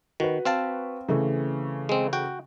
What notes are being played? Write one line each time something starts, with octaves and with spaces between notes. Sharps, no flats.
D#3 F#4 B4
C4 F5 A5
C#3 E3 A3
G#3 C4
F#4 G5